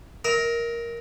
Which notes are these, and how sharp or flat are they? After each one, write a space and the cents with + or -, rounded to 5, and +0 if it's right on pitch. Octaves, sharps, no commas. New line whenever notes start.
A#4 +5 E5 -45